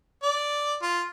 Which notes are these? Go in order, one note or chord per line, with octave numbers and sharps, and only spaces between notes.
D5
F4